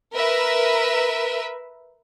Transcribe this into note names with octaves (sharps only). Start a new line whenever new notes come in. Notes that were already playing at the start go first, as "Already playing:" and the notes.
A#4 B4 E5